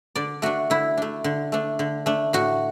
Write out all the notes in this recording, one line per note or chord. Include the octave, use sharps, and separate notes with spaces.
D3 D5
A3 D4 F#4
D3 E4
A3 D4
D3
A3 D4
D3
A3 D4
A2 F#4